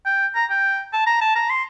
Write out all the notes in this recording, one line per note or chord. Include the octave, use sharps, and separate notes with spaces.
G5
A#5
G5
A5
A#5
A5
A#5
C6